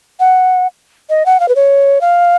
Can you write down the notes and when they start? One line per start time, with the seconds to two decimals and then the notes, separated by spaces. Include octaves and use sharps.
0.20 F#5
1.10 D#5
1.26 F#5
1.40 F5
1.49 B4
1.56 C#5
2.01 F5